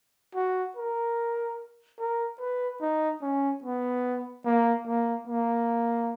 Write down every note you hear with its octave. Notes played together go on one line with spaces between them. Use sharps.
F#4
A#4
A#4
B4
D#4
C#4
B3
A#3
A#3
A#3